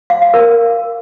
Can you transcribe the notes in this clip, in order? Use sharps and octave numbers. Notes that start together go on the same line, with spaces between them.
F5
F5
A#4